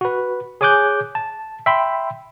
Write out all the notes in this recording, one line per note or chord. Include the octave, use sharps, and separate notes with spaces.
F#4 B4
G#4 C#5 G#5 D6 F#6 G6
A5
E5 G5 B5 C6